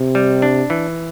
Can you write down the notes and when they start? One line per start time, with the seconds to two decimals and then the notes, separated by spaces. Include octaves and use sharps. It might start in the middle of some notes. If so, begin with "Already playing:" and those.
Already playing: C3
0.15 G3
0.42 D4
0.70 E3